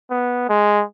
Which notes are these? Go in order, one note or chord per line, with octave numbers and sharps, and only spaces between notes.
B3
G#3